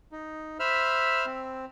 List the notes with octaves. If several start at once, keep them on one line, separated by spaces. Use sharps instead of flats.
D#4
C5 E5 B5 E6 F6
C4